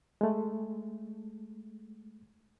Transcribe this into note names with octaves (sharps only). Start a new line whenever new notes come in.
G#3 A3